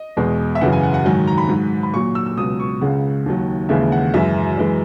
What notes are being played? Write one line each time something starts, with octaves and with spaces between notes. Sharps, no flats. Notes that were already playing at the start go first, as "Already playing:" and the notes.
Already playing: D#5
E2 B2 G#3
E5
F#2 C#3 E3 F#5
G#5
F#5
F#5
G#2 D#3 F#3 G#5
A#5
B5
G#2 F#3
B5
A#2 F#3 C#6
E6
E6
C#2 B2 F#3 D#6
C#6
C#2 C#3 G#3 F#5
D#2 D#3 F#3
D#2 C#3 E3 G#3 E5
F#5
F#2 E3 G#3 E5
F#2 E3 G#3